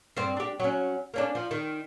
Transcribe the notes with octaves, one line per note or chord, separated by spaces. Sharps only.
G2 C4
D4 G4
F#3 C#4
A#3 C#4 D4
F3
D#3